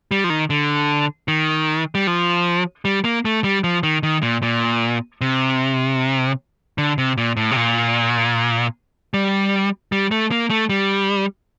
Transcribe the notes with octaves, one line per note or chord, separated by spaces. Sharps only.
G3
F3
D#3
D3
D#3
G3
F3
G3
A#3
A3
G3
F3
D#3
D#3
A#2
A#2
C3
D3
C3
A#2
A2
C3
A#2
G3
G3
A3
A#3
A3
G3